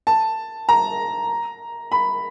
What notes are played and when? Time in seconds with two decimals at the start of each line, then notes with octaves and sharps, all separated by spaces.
0.07 A5
0.69 A#5
1.92 B5